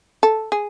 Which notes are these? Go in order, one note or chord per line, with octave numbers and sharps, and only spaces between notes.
A4
G#4